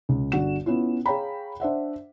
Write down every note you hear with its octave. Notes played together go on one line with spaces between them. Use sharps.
C#2
G1 D3 F#4 F#5 E7
B3 C#4 E4 F4
G#4 C#5 F5 G5 A#5 B5
D4 C5 E5 F#5